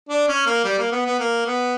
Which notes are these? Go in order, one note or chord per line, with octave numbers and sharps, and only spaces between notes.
D4
C#4
A#3
G3
A#3
B3
B3
A#3
B3